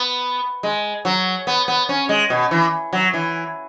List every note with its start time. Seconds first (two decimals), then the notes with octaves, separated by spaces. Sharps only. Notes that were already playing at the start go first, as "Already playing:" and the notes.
Already playing: B3
0.63 G#3
1.05 F#3
1.47 B3
1.68 B3
1.89 C#4
2.09 G#3
2.30 B2
2.51 E3
2.93 F#3
3.14 E3